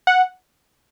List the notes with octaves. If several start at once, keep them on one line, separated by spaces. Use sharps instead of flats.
F#5